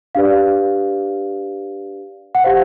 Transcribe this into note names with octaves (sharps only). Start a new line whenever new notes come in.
D4 G4 B4 D5 F5
F#5
G4 C5 F5